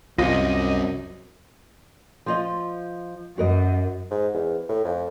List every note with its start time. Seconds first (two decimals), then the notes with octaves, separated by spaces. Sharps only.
0.18 C2 F#2 C3 F4 D#5
2.26 F3 F4 D#5
3.38 F#2 F#4 A#4 D#5
4.11 G#2
4.34 E2
4.69 A2
4.84 F2